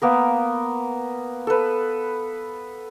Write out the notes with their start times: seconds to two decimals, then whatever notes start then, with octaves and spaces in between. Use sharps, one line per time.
0.02 A#3 B3 A#4
1.47 A4 B4